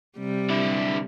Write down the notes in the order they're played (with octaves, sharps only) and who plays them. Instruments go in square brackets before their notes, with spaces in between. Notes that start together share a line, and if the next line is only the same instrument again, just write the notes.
[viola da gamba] C3 G3
[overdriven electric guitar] D3 E4